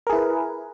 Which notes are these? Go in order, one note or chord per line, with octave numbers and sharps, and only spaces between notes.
E4 G#4 A#4 B4